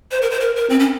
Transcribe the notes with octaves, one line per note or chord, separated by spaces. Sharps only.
C5
A#4
C5
A#4
A#4
C4
C#4